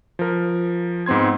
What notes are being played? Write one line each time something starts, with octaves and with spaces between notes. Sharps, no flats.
F3 A#4
G#2 B3 C4 C6 G#6